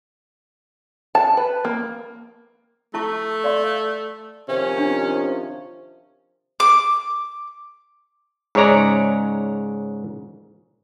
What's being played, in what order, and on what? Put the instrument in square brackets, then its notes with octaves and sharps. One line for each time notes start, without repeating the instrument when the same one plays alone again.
[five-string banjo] A5
B4
A#3
[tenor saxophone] A3 [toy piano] E4 A5 C#6
[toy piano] D5 F5 C6
[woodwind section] C3 D#3 F3 [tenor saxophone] C#4
[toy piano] D4
[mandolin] D6
[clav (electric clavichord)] G#2 C#3 G#3 C#5 D5 A#5